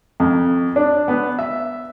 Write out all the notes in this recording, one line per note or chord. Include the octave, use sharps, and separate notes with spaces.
F2
D4
B3
E5